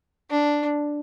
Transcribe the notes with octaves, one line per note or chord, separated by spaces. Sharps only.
D4